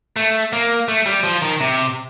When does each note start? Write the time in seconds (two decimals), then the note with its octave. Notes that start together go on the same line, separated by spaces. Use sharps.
0.16 A3
0.53 A#3
0.88 A3
1.06 G3
1.23 F3
1.42 D#3
1.60 C3